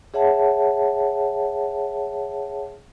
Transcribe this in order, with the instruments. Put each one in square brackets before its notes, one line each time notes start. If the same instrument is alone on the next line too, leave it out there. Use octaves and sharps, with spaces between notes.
[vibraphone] G#4 C#5 E5 F#5 A5